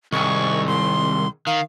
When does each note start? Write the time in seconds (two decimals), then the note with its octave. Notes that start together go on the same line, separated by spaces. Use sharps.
0.12 C2 D#3 G#4 G5 C#6
0.67 C6
1.47 D#3 F5